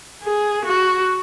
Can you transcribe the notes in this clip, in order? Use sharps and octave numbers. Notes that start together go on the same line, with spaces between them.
G#4
F#4